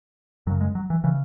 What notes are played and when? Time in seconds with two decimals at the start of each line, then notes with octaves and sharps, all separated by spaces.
0.47 F#2 F#3
0.50 C#3
0.61 G#3
0.75 F#3
0.90 E3
1.04 C#3 E3